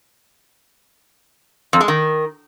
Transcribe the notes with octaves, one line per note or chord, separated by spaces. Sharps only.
F2
G#3
D#3